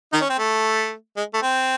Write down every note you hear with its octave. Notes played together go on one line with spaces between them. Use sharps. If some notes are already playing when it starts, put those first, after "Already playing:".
D#3 D#4
C#4
C4
A3
G#3
A3
C4